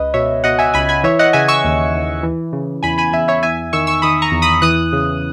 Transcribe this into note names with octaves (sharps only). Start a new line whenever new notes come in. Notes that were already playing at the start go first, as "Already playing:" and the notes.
Already playing: C#2 B4 D#5
B2 C#5 E5
B2 D#5 F#5
E5 G#5
C#2 G#5 B5
G#5 B5
E3 C#5 E5
D#5 F#5
C#3 E5 G#5
C#6 E6
D#2
D#2
E3
C#3
E2 G#5 B5
G#5 B5
E2 E5 G#5
C#5 E5
E2 E5 G#5
D#3 C#6 E6
C#6 E6
D#3 B5 D#6
A#5 C#6
E2
B5 D#6
E3 D#6 F#6
C#3